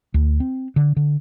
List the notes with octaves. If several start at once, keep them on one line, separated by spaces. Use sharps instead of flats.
D2
C4
D3
D3